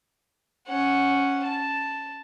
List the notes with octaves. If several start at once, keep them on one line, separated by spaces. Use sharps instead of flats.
C#4 F#5
A5